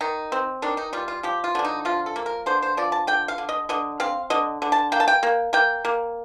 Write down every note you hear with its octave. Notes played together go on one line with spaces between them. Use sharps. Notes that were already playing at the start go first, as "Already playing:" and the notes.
D#3 D#4
C4
D#3 D4
D#4
G3 F4
F4
F3 G4
F4
D3 D4
D#4
F3 F4
A4
A#3
A#4
D3 C5
C5
F3 D5
A5
D3 G5
F5
D3
D#5
D3 D#5
C4 F5
D3 D#5
D3
A5
A#3 G5
A5
G5
A#3
A#3 G5
A#3